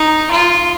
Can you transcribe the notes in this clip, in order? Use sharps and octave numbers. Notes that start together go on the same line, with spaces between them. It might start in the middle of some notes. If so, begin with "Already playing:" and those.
Already playing: D#4
F4